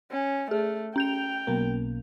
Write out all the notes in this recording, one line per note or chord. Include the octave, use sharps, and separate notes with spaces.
C#4
A3 G#4
C#4 G5 G6 F7
B1 B2 A#3